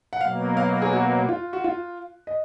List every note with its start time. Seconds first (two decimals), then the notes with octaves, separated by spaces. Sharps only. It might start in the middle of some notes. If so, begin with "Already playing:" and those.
0.13 F#5
0.20 B2 F#3 A#3 F5
0.57 F5
0.82 G#4
0.93 F#4
1.29 F4
1.53 F#4
1.64 F4
2.27 D#5